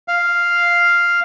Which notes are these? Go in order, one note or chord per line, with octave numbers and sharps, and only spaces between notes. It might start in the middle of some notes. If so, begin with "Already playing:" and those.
F5